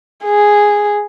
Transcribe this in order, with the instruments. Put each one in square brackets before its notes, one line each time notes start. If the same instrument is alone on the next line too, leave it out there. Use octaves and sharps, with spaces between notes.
[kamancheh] G#4